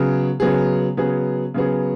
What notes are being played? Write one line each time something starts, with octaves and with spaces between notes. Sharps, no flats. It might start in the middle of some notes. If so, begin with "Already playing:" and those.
Already playing: C#3 F#3 B3 G#4
C#3 F#3 B3 G#4
C#3 F#3 B3 G#4
C#3 F#3 B3 G#4